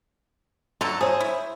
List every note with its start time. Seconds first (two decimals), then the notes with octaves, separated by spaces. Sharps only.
0.81 D3 F#3 A4 A#5
1.01 G#4 C5 C#5
1.20 E4